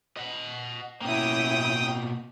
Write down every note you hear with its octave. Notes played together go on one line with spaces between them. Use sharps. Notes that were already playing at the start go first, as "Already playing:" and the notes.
D#5 F#5
B2 A#3 C#4 E4 G5 D#6